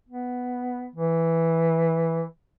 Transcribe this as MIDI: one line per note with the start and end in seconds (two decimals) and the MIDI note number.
0.09 0.88 59
0.96 2.23 52